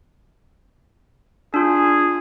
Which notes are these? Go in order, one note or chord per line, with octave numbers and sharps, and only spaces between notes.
D4 F4 G#4